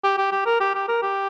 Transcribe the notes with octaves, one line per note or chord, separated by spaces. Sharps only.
G4
G4
G4
A#4
G4
G4
A#4
G4